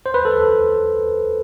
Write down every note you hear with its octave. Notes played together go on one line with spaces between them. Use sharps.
C5
B4
A4